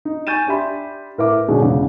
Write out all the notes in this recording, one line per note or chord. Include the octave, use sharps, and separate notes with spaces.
D#4
G#5 C#6 G6 A6 D#7 E7
D4 G4 E5 B5 C6
A2 A#4 B4 E5 D6
G#2 B2 D3 G#3 C#4 D4
E2 G#2 C#3